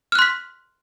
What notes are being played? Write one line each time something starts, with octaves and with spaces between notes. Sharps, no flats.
C6 F6 F#6 B6